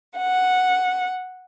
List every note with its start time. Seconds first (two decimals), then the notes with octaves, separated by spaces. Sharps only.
0.17 F#5